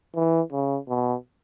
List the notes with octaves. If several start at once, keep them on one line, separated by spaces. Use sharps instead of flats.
E3
C#3
B2